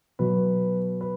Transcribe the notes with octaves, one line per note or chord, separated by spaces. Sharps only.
B2 F#3 B4
B4